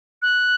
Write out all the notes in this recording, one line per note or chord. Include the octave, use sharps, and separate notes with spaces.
F#6